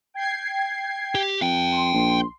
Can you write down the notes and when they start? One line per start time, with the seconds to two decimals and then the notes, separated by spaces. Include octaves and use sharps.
0.14 G5 G#6 C7
1.15 G4
1.41 F2 F5 G5
1.72 C6
1.94 A#1